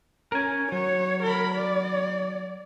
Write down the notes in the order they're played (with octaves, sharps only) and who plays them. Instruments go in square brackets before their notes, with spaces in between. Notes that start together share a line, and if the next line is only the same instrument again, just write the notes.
[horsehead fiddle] C#4 [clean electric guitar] A#4 G#5
[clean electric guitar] F#3 [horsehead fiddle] C#5
[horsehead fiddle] A#4 B5
D5